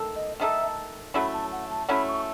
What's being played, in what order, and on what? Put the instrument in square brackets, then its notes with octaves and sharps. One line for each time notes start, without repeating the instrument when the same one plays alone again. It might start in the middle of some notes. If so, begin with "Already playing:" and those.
Already playing: [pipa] D#3 A3 A4
[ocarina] D#5
[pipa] D#3 A3 D#4 A4 [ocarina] E5
[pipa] F#3 A3 C#4 E4 [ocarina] B5
[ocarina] A5
F#5
A5
[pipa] F#3 A3 C#4 E4 [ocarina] B5
[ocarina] C#6